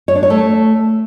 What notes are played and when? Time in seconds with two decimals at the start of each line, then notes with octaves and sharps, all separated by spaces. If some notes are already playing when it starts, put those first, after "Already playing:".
0.08 C#5
0.15 D4
0.23 C#5
0.30 A3